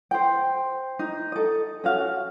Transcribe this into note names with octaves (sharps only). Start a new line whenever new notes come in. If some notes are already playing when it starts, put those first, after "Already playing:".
C5 G5
D#4
A4 D#5
C#4 F#4 F5